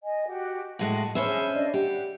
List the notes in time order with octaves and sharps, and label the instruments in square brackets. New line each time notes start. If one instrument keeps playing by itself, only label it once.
[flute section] D#5 G#5
F#4 G4 F#5
[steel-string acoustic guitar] A2 G#3 F#4 [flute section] A5
[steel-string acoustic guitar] C#4 C5 E5 [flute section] G#4 B5
[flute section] D4 D5 D#5
[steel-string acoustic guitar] G4 [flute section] F#5